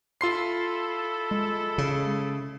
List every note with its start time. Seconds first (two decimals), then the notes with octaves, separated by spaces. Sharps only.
0.21 E4 F4 A4 C6 C7
1.31 G#3
1.78 C#3